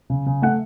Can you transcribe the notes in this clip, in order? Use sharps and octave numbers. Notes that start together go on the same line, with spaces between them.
C#3
C#3
A3 F#5